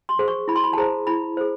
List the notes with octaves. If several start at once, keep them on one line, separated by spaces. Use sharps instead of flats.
C6
G#4 C5
C#6
E4 B5
C6
B5
A5
G#4 C5 A#5
E4 B5
G#4 C5